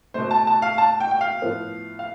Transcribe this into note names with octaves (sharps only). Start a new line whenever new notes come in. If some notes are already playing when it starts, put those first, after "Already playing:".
B2 A3 C5
A5
A5
F5
A5
G5
G5
F5
A2 F3 B3
F5